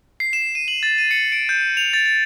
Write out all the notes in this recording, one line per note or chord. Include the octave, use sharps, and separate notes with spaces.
C7
E7
D#7
F#7
A6
D#7
C#7
D7
G6
F7
A6
A6